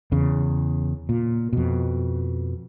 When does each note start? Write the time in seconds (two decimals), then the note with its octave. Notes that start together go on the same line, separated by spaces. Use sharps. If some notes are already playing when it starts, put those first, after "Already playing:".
0.12 E2 C#3
1.09 A#2
1.53 F2 B2